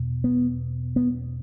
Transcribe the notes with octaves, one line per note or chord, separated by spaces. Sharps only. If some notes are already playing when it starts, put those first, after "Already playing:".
Already playing: E2 B2
B3
B3